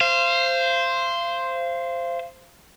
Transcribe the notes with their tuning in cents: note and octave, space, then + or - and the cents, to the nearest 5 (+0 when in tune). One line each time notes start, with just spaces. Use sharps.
C5 +0 F5 -30